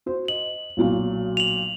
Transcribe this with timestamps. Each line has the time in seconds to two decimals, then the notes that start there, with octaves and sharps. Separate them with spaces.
0.06 F#4 C5
0.28 D#5 F#7
0.77 B1 A#2 F#3
1.37 F7 F#7